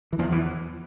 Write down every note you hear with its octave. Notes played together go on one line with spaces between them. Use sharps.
E3
E2 F3
E3